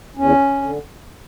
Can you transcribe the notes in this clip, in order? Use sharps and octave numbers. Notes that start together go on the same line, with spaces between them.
E2 C#4
D3